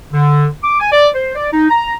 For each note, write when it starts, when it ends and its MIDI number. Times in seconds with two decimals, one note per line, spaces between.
0.12 0.46 50
0.63 0.77 86
0.80 0.90 80
0.92 1.08 74
1.14 1.33 72
1.35 1.47 74
1.52 1.65 63
1.69 1.94 82